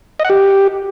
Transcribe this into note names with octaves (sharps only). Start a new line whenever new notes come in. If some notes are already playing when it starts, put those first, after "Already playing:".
D#5
F#5
G4